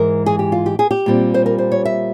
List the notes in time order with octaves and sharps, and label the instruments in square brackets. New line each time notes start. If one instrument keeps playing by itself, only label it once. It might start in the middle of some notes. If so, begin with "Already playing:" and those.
Already playing: [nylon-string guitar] G#2 E3 G#3 A#4
G#4
G4
F4
G4
G#4
G4
A#2 G3 C4
C5
A#4
C5
C#5
E5